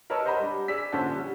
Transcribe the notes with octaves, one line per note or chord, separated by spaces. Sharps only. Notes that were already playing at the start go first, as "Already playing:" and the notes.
A#4 B4 C#5 D#5 A5 E6
C5 D#5 F#5 A#5 B5
G3 D4
G#4 D5 E6 B6
A#1 D3 C#4 C5 F#5 A5
G3